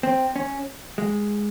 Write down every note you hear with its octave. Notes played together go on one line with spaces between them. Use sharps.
C4
C#4
G#3